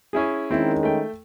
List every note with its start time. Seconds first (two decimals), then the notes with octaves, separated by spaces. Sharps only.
0.13 C#4 E4 G#4
0.51 D#3 G#3 C4 C#4 E4
0.83 A3 G5